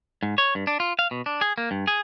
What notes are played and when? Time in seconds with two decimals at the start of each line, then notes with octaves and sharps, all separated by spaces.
0.23 G#2
0.38 C#5
0.55 G2
0.67 D4
0.80 F4
0.99 F5
1.11 B2
1.26 D4
1.41 G#4
1.58 A#3
1.71 G2
1.87 G#4